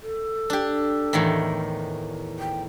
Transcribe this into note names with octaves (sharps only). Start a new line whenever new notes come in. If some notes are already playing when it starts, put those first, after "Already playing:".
A4
D4 G4
E2 A2 D#3
G5